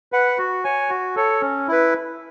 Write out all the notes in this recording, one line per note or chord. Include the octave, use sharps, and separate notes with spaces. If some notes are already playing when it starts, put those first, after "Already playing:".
B4 F#5
F#4
C#5 G#5
F#4
A4 C#5
C#4
E4 B4